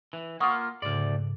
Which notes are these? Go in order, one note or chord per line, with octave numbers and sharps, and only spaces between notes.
E3
A#3 F4 F#5 C#6 D#6
D2 G#2 C#3 D5